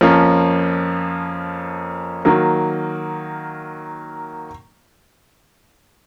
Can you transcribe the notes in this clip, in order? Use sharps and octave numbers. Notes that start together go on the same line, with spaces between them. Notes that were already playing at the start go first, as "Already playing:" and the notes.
F2 F3 A#3 C#4
D#3 F#3 A#3